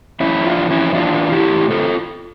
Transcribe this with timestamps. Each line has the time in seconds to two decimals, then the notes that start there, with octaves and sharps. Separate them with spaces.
0.20 F2 C#4 E4
0.39 F2
0.45 D4 F4
0.58 E3
0.70 C#4 E4
0.76 F2
0.95 E3 D4 F4
1.14 E3
1.32 E3 E4 G4
1.51 A2
1.70 D3 F4 A4